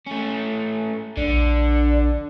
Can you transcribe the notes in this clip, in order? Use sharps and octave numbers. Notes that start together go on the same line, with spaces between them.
A3 C#4
A#1 D3 D4